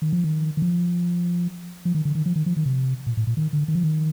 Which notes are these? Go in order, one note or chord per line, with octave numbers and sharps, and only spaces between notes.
D#3
F3
D#3
D#3
F3
F3
D#3
D3
D#3
F3
D#3
F3
D#3
C3
A#2
A2
A#2
D#3
D3
D#3
F3
D#3